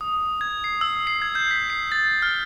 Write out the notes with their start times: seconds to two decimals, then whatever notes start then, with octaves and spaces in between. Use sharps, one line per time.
0.01 D#6
0.41 G#6
0.64 C7
0.81 E6
1.07 C7
1.22 G#6
1.35 G6
1.51 B6
1.70 C7
1.92 A6
2.22 F6